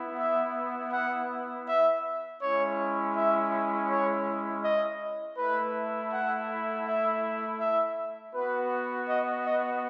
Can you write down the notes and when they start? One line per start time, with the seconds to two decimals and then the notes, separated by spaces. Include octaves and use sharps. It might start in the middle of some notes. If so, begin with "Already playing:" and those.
Already playing: B3 E4
0.17 E5
0.91 F#5
1.66 E5
2.40 G#3 C#4 E4 C#5
3.15 E5
3.89 C#5
4.63 D#5
5.37 A3 E4 B4
6.12 F#5
6.86 E5
7.60 E5
8.34 B3 F#4 B4
9.08 D#5
9.46 D#5